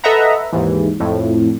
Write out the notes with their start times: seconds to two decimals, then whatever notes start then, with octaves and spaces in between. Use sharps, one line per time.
0.04 A4 B4 D#5 E5 F#5 A#5
0.53 D#2 G#2 E3
1.00 F2 A2